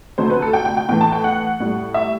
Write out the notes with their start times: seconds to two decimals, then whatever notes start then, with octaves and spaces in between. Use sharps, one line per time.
0.18 D2 C3 F#3 A3 C5
0.30 B4
0.42 A4
0.53 G5
0.65 G5
0.77 G5
0.89 A2 E3 A3 G5
1.01 A5
1.12 G5
1.24 F#5
1.60 A2 G3
1.94 E5